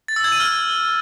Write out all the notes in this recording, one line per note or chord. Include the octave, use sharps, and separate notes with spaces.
A6
E6
G#6
D#7
F6